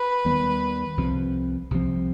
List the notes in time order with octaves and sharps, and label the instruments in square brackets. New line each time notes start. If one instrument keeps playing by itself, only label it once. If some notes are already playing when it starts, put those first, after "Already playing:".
Already playing: [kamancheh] B4
[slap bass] D#2 D#3 G3 B3
C2 C3 F3 C4
C2 C3 F3 C4